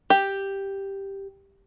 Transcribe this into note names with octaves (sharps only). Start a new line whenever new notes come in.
G4